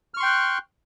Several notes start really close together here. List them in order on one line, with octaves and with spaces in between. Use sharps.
F6 C#6 C6 G5 F#6